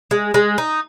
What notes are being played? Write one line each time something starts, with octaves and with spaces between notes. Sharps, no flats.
G#3
G#3
D#4